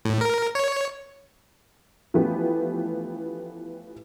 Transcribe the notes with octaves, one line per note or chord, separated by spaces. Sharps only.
A2
A#4
C#5
E3 F3 A3 B3 C#4 G4